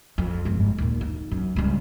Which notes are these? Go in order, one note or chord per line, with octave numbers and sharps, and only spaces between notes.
F2
G1 G#2
D#2 A#2
D#4
F#2
C#2 G2